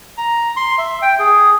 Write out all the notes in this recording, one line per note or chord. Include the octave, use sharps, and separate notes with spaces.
A#5
C6
E5
G5
G#4